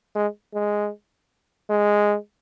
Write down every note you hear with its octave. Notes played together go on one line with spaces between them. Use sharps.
G#3
G#3
G#3